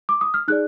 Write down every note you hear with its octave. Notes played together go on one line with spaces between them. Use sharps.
D6
D#6
F6
D#4 G#4 D5 F#6